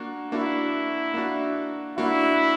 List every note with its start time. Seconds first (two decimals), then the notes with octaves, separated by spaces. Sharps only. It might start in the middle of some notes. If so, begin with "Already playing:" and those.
Already playing: A#3 D4 F#4
0.32 A#3 D4 E4 F#4
1.14 A#3 D4 F#4
1.97 A#3 D4 E4 F#4